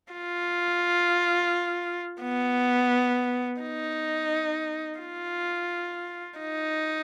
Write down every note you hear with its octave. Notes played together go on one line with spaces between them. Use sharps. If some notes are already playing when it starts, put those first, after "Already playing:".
F4
B3
D#4
F4
D#4